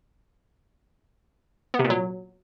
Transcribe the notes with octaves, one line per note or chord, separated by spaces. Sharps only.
B3
C3
A#2
F#3